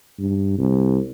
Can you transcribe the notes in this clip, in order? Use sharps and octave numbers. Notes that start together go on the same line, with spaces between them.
G2
C2